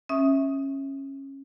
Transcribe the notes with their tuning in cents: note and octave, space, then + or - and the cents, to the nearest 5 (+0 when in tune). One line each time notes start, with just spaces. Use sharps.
C#4 -20 E5 -15 D#6 +0